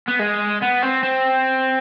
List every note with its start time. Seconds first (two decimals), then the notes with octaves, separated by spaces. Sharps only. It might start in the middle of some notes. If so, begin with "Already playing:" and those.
0.08 B3
0.20 G#3
0.62 B3
0.83 C4
1.03 C4